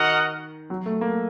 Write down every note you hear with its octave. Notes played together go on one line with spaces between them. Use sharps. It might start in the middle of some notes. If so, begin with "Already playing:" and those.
Already playing: D#3 F#4 A#4 D#5 F#5
F#3
A3
A#3